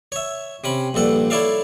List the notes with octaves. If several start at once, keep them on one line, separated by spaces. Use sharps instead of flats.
C#5 E5
C3 C#4 B5
A#1 G2 A4 F#5
E4 A4 C#5 D5 E5 F5